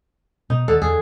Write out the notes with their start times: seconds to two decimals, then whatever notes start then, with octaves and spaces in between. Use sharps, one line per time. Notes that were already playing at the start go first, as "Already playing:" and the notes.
0.50 B2 D#4
0.68 D#2 D3 A4
0.82 E2 G#4